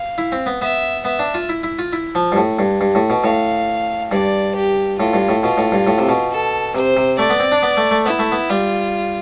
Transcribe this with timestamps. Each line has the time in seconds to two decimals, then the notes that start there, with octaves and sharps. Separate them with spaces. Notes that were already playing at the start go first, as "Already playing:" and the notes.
Already playing: F5
0.18 E4
0.32 C4
0.46 B3
0.62 B3 E5
1.05 B3 E5
1.19 D4
1.34 F4
1.49 E4
1.64 E4
1.79 F4
1.93 E4
2.15 F3
2.32 G2
2.37 A2
2.59 G2
2.81 G2
2.95 A2
3.10 B2
3.24 A2 F5
4.12 G2 D5
4.55 G4
4.99 A2 F4
5.14 G2
5.29 A2
5.43 B2 F4
5.58 A2
5.72 G2
5.87 A2
5.98 C3
6.09 B2
6.31 A4
6.75 C3 C5
6.97 C3
7.19 A3 D5
7.30 B3
7.40 C4
7.52 D4
7.63 B3
7.77 A3
7.91 A3
8.06 B3 E4
8.19 A3
8.32 B3
8.49 G3 F4